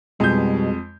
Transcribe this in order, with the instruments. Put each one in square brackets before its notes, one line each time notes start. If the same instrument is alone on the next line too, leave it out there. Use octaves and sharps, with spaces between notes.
[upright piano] F2 G6 [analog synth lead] B2 [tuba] G3 [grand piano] G#3